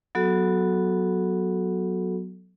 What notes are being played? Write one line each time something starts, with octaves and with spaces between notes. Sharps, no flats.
F#3 B3 F#4 A4